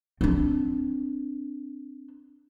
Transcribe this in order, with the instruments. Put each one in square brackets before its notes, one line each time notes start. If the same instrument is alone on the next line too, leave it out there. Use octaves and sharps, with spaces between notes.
[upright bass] C4 D4